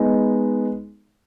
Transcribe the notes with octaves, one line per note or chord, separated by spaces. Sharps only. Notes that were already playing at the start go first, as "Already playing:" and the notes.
Already playing: G#3 B3 D#4